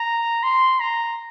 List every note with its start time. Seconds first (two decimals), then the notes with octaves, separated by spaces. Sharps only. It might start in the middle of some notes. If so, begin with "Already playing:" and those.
Already playing: A#5
0.43 C6
0.80 A#5